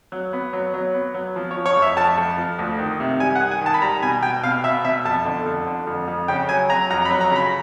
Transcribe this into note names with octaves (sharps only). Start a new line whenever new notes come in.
F#3
B3
F#3
F#3
B3
F#3
F3
C#5
F3
C#5
F2
E5
F2 A5
F2
F3
D2
D#3
C3
G3 G#5
F#5
D#3
G#5
D#3 A5
B5
G3 A#5
B2 G#5
B2 G5
B2 F5
B2 E5
B2 E5
F2 A5
D3
F2
D3
F2
F2
C#3 G5
F#3 G#5
F#3 A#5
F2 A#5
B5
F#3
A#5
C#3 B5